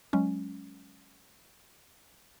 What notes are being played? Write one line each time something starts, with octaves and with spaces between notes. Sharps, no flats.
F#3 G#3 C#4